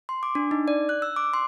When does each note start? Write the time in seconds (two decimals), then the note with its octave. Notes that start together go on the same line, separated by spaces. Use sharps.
0.09 C6
0.23 D6
0.35 D4
0.51 D#4
0.68 D5
0.89 F#6
1.02 E6
1.16 D6
1.34 C6